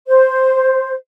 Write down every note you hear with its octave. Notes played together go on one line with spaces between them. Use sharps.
C5